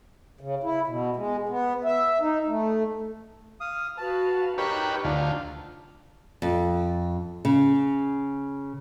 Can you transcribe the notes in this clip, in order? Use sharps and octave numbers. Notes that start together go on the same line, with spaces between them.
C#3
E4
B2
G#3
B3
E5
D#4
A3
F5 D#6
F#4 B4 F5 A5
D#4 G4 A#4 B4 C#5 G5 B5 F#6
D2 D4 F4
F2
C#3